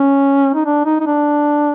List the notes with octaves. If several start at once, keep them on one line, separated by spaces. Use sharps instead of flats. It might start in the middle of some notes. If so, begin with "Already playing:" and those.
Already playing: C#4
D#4
D4
D#4
D#4
D4